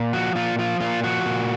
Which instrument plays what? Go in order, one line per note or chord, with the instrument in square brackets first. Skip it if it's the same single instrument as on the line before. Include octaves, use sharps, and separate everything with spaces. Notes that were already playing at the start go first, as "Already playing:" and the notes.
Already playing: [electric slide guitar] A#2
F3 F#4
A#2 F4
F3 F4
A#2 F4
F3 F#4
A#2